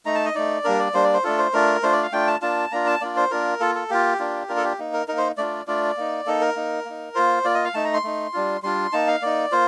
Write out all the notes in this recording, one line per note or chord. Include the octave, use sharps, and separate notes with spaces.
A3 D#4 A#5
A5
D#5
A3 D#4 D5
G3 A#3 D4 A#4
D5
G3 A#3 D4 C5
D5
C5
A3 D4 F4 A4
C5
A3 D4 F4 A#4
A3 D4 F4 C5
D5
F5
A3 D4 F4 G5
A5
A#3 D4 F4 A5
A#3 D4 F4 A#5
A5
A#3 D4 F4 D5
C5
A#3 D4 F4 A#4
A#3 F4 A4
A4
A#3 F4 G4
A#3 D4 F4
A#3 D4 F4 A#4
A4
G4
A#3 D#4
A#4
A#3 D#4 A#4
C5
A3 D4 F4 D5
A3 D4 F4 D5
A#3 D#4
A#3 D#4 A4
A#4
A#3 D#4
A#3 D#4
A#3 F4 C5
A#3 F4 D5
D#5
F5
A3 D#4 A5
A#5
C6
A3 D#4
G3 D4 F4
G3 D4 F4 C6
A#3 D#4 A5
F5
A#3 D#4 D5
A#3 F4 C5